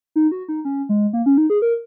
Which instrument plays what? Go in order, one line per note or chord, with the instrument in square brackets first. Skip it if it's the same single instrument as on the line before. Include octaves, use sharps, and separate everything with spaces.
[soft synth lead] D#4
F#4
D#4
C#4
G#3
A#3
C#4
D#4
G#4
A#4